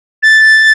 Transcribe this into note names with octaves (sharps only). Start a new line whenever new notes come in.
A6